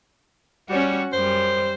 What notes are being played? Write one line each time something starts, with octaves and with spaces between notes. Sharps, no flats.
G3 C#4 F#4
F#2 G3 C5